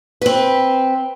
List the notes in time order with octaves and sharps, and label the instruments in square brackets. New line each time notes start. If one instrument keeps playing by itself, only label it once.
[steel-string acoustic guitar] C4 B4